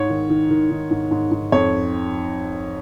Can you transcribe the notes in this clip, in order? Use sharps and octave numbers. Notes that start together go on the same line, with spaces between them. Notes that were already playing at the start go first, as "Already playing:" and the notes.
Already playing: G#2 C#5
D#3
D#3
D#3
D#3
G#2
G#2
G#2
F2 C#5